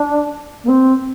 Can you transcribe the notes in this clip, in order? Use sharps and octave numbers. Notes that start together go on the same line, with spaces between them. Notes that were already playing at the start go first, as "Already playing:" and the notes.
Already playing: D4
A#3
C4